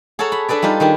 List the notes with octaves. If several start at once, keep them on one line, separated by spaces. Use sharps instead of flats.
G#4 A4 C#5 F#5 A5 A#5
B5
D4 G#4 A4 B4 D5
G3 D#4 F4 G4
D#3 D4 G4 G#4